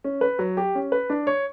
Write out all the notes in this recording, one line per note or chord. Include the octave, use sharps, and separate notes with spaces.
C#4
B4
F#3
G4
C#4
B4
D4
C#5